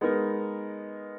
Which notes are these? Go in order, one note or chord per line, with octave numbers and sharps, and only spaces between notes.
G#3 B3 D#4 A#4